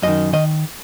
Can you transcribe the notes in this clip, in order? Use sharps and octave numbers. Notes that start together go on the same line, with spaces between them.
F#2 D#3 D#5
D#3 D#5